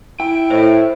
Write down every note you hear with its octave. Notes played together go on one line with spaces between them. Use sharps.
E4 G5
A2 C5 D#5 E5